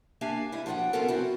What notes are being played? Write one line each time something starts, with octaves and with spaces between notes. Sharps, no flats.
A#3 D4 G4 E5 F5 G#5
G3 G#3 E4
F3 F#3 D4 B4 F#5 G5
B3 C#4 F4 F#4 A4 A#4
C4 E4 F#4